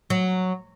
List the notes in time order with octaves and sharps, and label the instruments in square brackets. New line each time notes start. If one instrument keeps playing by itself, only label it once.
[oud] F#3